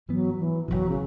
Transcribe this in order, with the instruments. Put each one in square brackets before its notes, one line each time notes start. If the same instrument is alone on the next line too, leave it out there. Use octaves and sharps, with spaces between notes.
[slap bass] G#2 E3 B3 [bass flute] F#3
[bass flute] E3
[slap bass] F#1 E2 B2 [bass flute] F#3
[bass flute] C#3